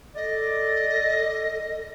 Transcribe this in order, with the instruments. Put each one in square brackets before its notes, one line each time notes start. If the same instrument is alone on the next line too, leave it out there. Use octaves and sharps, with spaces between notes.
[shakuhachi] A4 [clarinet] D5 [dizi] D#5